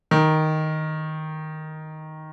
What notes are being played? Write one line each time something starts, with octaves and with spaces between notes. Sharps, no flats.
D#3